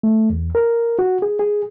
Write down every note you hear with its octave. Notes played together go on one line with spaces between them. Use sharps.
A3
E2
A#4
F#4
G#4
G#4